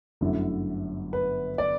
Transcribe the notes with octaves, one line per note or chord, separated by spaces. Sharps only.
G1 F#2 D3 A3 E4
B4
D5